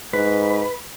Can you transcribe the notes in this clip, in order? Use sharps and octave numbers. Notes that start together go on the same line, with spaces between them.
G#2 B4